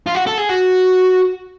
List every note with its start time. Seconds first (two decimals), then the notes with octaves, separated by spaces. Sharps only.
0.06 F4
0.15 F#4
0.26 A4
0.38 G#4
0.49 F#4